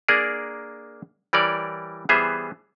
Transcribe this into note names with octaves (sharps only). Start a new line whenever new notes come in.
A#3 D4 G#4 A#4 D5
E3 G3 A#4 C#5 D5
E3 G3 B3 G#4 C5 E5